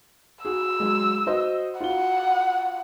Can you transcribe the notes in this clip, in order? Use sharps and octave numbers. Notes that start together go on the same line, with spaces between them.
F#4 G#4 E6
F#3 G#3
F#4 C5 D#5
F4 F#4 F#5 G7